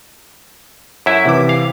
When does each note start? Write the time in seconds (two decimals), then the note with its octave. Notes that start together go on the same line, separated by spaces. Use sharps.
1.06 F#2 E4 E5
1.25 C3 E3 D6
1.49 F5